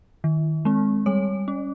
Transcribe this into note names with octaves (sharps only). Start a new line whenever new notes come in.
D#3
G#3 C4
G3 C#5
C#4